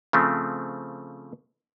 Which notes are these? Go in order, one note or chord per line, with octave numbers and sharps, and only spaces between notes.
C#3 F3 A3 C4